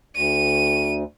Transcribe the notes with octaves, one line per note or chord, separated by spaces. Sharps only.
D2 D#7